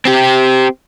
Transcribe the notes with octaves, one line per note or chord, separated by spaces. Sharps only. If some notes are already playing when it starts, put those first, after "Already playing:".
C4 G4